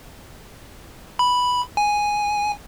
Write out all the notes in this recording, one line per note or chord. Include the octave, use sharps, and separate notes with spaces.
B5
G#5